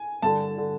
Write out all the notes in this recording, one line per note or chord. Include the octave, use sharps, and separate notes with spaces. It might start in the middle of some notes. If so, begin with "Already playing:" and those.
Already playing: G#5
G2 D3 A5
D3